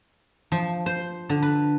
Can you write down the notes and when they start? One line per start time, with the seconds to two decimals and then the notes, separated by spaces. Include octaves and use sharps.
0.52 F3
0.86 C5
1.29 D3
1.42 B4